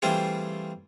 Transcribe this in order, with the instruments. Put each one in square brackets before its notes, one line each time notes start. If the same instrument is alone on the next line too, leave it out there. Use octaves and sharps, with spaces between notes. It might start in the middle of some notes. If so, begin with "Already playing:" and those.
[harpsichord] E3 G3 A3 C4 F4 G#4